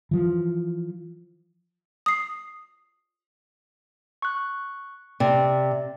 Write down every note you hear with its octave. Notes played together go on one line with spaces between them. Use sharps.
E3 F3
D#6 C7
C#6 F#6
C3 D5